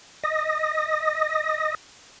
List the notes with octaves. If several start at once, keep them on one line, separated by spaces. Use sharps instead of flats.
D#5 D#6 A#6